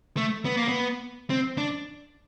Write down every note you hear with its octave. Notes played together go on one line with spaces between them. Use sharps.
A3
B3
A#3
B3
C4
D4